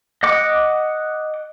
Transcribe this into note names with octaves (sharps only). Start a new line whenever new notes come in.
D#5 F#5 D6